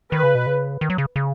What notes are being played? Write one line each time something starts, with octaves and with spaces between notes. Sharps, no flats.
D#3 B4
C#3
B2
C#3
D#3
F#3
C#3
C#3